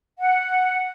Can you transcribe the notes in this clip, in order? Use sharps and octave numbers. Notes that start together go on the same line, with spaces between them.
F#5